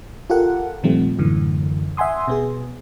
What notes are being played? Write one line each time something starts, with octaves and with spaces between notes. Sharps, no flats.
F4 G4 A4 A#4 F#5
A#2 D#3 F3 G3 A3 C4
F#2 A2 D3 E3
E5 F#5 G#5 C6 D#6
B2 B3 G#4